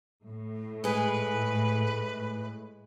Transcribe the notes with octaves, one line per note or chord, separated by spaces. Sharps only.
A2
G#3 G#4 B4